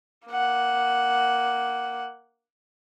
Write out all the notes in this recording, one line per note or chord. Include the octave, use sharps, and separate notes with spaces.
A#3 F#5